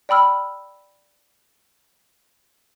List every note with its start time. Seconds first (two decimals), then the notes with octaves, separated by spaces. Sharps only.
0.09 D5 G5 B5 E6 F6